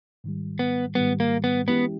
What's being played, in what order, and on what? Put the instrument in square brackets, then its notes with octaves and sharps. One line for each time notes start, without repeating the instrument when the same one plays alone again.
[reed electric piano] G#2 D#3 G3
[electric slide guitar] B3
[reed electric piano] G#2 D#3 G3 [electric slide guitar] B3
[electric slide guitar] A#3
B3
[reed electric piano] E3 G#3 C#4 E4 G4 [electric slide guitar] B3